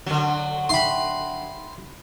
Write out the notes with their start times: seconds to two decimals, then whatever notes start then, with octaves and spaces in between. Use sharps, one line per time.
0.06 D3 F#3
0.69 D#4 E5 G5 B5 C6